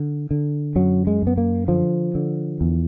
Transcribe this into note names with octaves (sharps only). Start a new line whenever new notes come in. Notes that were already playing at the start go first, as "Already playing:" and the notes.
Already playing: D3
D3
F#2 F#3
G#3
F#2 B3
A#3
D3 F3
D3
E2